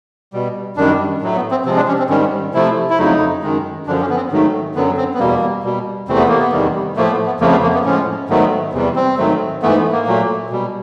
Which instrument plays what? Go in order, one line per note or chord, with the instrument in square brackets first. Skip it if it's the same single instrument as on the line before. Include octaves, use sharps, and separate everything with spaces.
[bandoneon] B2 G3
F#2 D#3 G3 D4
A2 F#3 A3
B3
C4
C3 F3 G#3 C4
D4
C#4
C4
G#2 D#3 G3 C#4
C3 F3 A3 E4
E4
F2 C#3 F#3 A3 D#4
F#2 D#3 G#3
F#2 D3 F3 D4
C#4
B3
C4
G#2 D#3 F#3 A3
F#2 D3 F#3 B3
C4
B3
E2 B2 G3 A#3
B2 G3
E2 C3 E3 A3 C4
B3
A#3
B3
E2 C3 D#3 G3
A2 F3 A3 A#3
B3
B3
F2 C#3 F3 A3 A#3
B3
A#3
B3
A2 F3 G#3 C#4
G#2 D#3 F#3 A3 B3
E2 C3 E3 G3
C4
G#2 D#3 F#3 A3
G#2 E3 A3 B3
B3
A#3
A#2 F#3 A3
B2 G3